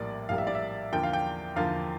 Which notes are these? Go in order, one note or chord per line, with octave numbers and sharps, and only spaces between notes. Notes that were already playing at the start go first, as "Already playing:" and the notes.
Already playing: A#1 A2 G3 A#3 D5
A#1 A2 G3 A#3 F5
E5
D5
E5
E2 D3 F3 A#3 G5
F5
G5
E2 D3 F3 A#3 F5